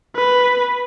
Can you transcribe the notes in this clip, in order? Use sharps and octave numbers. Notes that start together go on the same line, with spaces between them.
B4